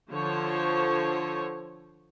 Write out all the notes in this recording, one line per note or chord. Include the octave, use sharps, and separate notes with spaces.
D3 F3 C5 C#5